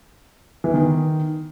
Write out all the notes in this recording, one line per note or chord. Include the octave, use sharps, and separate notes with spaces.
E3
D#3